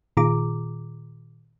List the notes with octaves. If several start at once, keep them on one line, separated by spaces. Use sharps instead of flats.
A#2 D#3 F4 G#4 A#5 D6